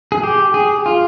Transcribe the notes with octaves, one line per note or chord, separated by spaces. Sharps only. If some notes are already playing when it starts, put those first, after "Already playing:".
G#4
G4
G#4
F4